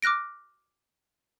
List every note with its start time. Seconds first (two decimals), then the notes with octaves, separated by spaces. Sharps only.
0.02 D6 F6 F#6 A#6 D7